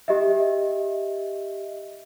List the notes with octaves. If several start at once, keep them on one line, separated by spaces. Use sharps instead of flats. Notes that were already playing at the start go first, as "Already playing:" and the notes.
G4 D#5 E5